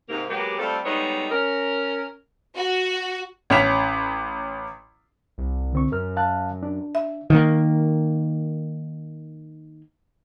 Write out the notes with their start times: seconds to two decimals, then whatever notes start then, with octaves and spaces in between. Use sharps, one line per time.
0.09 G#2 C3 A#3
0.30 F#3 G#3 A#3 B3 G4
0.59 G3 A3 C4 F4 A4
0.85 G3 G#3 B3 D#4 A4 C#5
1.31 C#4 A#4
2.57 F#4
3.50 A1 C#4 B6 F7
5.38 C2
5.73 D3 C4 C#6
5.92 F#2 A#4 F6
6.17 F5 A5 F#6
6.63 D4
6.95 E5
7.30 D#3 A#3